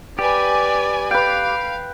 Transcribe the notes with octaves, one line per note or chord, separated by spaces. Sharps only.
G4 B4 D5 G#5
B4 F5 G5